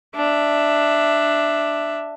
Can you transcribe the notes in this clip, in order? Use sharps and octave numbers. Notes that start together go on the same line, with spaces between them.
D4 E5